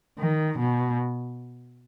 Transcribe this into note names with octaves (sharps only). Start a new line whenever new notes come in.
D#3
B2